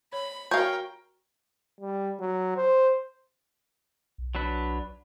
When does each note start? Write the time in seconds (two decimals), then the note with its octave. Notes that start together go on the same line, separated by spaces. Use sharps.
0.13 C#5 B5
0.51 F#4 A#4 C#5 F5 G5 G#5 G6
1.81 G3
2.20 F#3
2.56 C5
4.18 B1
4.35 F#3 D4 B4